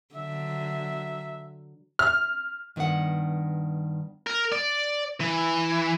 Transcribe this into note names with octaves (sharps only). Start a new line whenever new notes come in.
D3 F#3 E5
F6
G2 D#3 B3 D4 F#5
A#4
D5
E3